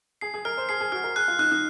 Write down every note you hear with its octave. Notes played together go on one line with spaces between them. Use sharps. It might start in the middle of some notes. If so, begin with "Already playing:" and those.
G#4 C7
G#4
A#4 F6
C5
G#4 C7
G#4
F#4 F6
A#4
G#4 F#6
F4
D#4 F#6
D#4